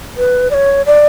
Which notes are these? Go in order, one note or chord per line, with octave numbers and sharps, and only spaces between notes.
B4
D5
C#5
D5